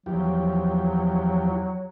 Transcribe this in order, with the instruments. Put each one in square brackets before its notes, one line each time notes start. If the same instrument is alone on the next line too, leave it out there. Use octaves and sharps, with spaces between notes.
[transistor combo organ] E2 F3 G4 [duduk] F#3